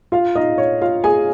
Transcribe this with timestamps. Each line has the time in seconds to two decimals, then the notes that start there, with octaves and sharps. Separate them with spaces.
0.12 F4 F5
0.35 D#4 D#5
0.58 C#5
0.82 F4 F5
1.04 G#4 G#5